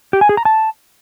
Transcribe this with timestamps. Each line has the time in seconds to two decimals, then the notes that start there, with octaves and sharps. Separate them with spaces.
0.13 G4
0.21 G#5
0.29 G#4
0.37 A#5
0.45 A5